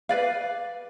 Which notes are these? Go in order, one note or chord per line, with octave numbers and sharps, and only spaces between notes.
B4 D5 F5